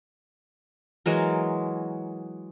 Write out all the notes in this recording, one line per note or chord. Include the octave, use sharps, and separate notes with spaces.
E3 F#3 G#3 A#4